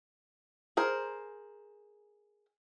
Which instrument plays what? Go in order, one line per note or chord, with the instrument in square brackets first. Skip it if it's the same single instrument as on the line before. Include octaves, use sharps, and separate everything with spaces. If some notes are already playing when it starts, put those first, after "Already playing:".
[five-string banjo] G#4 A#4 C5